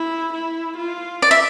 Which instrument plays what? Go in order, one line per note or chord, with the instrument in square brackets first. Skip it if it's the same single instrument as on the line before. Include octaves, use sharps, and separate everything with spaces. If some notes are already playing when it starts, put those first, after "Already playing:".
Already playing: [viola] E4
E4
F4
[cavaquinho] D5
E5